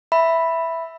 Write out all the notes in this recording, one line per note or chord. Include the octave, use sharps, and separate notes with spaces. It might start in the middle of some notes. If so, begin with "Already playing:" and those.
E5 B5